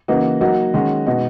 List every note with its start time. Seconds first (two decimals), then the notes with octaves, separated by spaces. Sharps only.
0.08 C#3 E3 A#3 D#4 F#4
0.41 F#3 A#3 D#4 F#4
0.74 D#3 G#3 C#4 F#4
1.07 B2 G#3 D#4 F#4